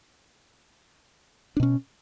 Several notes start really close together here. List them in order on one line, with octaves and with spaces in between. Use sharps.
D4 B2 C#4